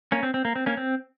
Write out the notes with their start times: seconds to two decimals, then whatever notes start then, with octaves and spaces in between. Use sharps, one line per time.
0.12 A#3 C#4
0.23 C4
0.34 C4
0.45 A#3
0.56 C4
0.66 A#3 C#4
0.77 C4